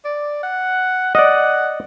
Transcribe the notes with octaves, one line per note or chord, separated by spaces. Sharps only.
D5
F#5
D5 D#5 F#5